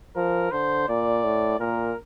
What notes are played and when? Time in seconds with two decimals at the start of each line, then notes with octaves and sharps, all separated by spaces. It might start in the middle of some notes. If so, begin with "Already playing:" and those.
0.16 F3 A#4
0.52 D3 C5
0.88 A#2 D5
1.24 A2
1.59 A#2 A#4